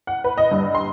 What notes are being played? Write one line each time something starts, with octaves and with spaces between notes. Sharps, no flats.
F#5
B4
D#5
G2
C6